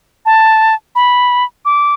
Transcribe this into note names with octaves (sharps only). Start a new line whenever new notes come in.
A5
B5
D6